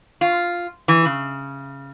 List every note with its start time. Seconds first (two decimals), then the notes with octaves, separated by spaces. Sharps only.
0.21 F4
0.88 E3
1.05 C#3